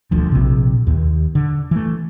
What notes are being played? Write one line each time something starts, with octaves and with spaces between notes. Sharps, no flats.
D#1 D2 D3 F3
A#1 C3
D#2
D3
E3 A3